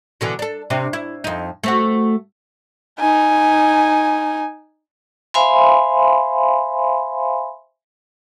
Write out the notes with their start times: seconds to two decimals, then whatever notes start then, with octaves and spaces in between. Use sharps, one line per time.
0.21 B2 D3 E3
0.39 D4 A4
0.70 C3 C4 D4
0.93 E4
1.24 F2 D#4
1.64 A3 C4 F#4
3.00 D#4 G#5
5.34 C5 E5 F5 G#5 B5 C6